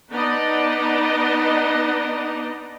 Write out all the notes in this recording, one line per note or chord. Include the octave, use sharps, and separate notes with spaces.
B3 D4 D#4 D5 D#5